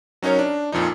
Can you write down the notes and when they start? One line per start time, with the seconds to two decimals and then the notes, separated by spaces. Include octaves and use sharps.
0.22 F#3 C#4 D#4 A#4 C#5
0.39 D4
0.72 F2 A#2 F3 D#4